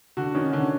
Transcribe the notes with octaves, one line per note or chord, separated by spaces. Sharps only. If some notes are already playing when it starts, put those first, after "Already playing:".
D3 F#4
D#3 C#4
D3 C#4